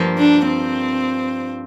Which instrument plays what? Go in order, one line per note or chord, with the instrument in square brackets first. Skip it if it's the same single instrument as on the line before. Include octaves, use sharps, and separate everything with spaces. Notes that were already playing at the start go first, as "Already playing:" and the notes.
Already playing: [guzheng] G2 F3 A#3
[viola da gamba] D4
C4